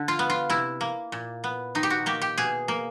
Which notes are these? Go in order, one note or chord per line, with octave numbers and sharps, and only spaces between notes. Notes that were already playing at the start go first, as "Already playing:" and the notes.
Already playing: D3
F4
B3
F4
C3 E4
A#3
A#2
B3
D#3 D#4
G4
F#4
A#3 G4
G4
B2 G#4
A#3